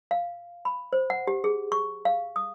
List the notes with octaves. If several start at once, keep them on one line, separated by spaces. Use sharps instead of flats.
F5
B5
C5
F#5
G4
G#4
C#6
F5
D#6